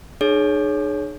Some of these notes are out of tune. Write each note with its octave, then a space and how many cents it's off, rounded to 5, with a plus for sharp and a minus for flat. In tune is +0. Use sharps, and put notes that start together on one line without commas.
D#4 -45 G#4 +20 C#5 +0